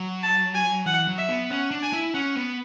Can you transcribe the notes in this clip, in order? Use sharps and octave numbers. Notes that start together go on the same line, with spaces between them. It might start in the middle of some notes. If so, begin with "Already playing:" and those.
Already playing: F#3
A5
G#5
E3 F#5
F#3
E5
B3
C#4 F#5
D4
G#5
E4
C#4 F#5
B3